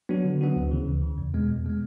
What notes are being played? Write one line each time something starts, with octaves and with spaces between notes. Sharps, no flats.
F#3 B3 D4 F#4
D3
F#3 B3 D4 F#4
D2
C#3 E3
D2
C#3 E3
E2
B2 G#3 B3
E2
B2 G#3 B3